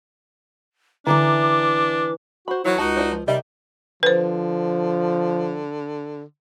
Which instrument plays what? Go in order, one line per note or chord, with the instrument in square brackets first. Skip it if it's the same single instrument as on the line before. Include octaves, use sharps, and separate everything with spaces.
[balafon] D3 [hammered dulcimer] E3 A#5 [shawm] D4 [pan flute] D6
[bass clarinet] F#4 [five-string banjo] C5 B5
[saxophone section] D#3 E3 F#3 [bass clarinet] E4
[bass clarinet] C#2 [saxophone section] D#4 F#4 [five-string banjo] A5
[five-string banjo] D4 E4 C5
F3
[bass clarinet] C3 [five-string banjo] D#3 D#5 E5 [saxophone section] G3
[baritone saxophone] D3 [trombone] F3 [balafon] B4 C5